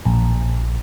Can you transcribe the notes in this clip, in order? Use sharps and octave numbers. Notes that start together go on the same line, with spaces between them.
A#1